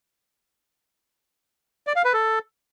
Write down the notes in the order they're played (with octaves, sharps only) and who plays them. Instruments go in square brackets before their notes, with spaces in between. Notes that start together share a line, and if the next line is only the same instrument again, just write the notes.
[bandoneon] D5
F5
B4
A4